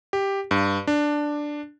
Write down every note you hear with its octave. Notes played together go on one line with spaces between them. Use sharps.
G4
G2
D4